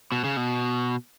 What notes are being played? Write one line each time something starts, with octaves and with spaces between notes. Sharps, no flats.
B2
C#3
B2